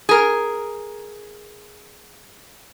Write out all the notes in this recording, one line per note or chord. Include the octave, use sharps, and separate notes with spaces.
G#4 A#4